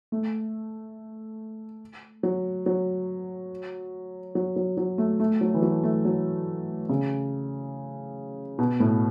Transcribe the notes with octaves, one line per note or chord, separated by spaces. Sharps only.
A3
F#3
F#3
F#3
F#3
F#3
A3
A3
F#3
E3
F#3
A3
F#3
C#3
B2
A2